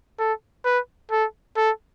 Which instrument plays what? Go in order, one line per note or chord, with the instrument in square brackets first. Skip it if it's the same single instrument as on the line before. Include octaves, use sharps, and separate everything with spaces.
[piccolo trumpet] A4
B4
A4
A4